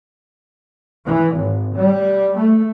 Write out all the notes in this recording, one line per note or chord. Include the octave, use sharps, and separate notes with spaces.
E3
G#1
G3
A3